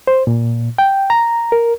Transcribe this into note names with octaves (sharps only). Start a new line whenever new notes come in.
C5
A#2
G5
A#5
A#4